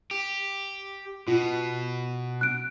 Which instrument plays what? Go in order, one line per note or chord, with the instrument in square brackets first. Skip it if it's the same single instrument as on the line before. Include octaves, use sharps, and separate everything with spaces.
[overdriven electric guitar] G4
[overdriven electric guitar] B2 [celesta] F4
[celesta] F#6 D7